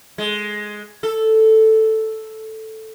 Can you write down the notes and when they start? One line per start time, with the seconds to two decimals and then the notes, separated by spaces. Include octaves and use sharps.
0.18 G#3
1.03 A4